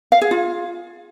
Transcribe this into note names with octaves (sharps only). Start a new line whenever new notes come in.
F5
G#4
F4